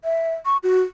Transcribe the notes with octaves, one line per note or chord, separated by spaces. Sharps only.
E5
C#6
F#4